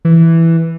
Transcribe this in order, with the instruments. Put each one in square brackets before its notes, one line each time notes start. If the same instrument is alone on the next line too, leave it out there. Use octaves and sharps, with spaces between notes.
[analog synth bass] E3